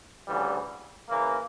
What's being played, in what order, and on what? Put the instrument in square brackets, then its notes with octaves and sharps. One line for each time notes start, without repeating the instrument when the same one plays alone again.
[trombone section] D2 C#3 E3 G3
C#3 E3 A#3